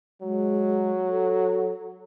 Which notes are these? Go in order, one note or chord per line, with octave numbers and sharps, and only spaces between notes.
F#3 G#3
A4